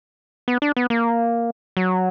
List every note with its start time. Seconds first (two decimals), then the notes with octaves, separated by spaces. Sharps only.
0.48 B3
0.62 D4
0.77 B3
0.90 A#3
1.77 F#3